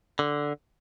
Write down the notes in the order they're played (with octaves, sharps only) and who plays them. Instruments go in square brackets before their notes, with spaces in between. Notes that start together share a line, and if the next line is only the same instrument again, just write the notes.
[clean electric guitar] D3